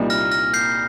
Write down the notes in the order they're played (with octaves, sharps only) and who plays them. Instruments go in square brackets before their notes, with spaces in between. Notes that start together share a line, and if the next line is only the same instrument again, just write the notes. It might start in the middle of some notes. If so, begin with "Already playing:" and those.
Already playing: [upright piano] C2 A#2 G3 A#3 D#4
[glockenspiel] F6 A#6
F6 A#6
G6 C7